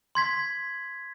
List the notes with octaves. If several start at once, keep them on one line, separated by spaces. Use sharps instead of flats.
C6 G#6 B6